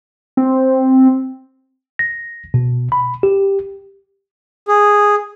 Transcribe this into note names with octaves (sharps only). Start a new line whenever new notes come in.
C4
A#6
B2
B5
G4
G#4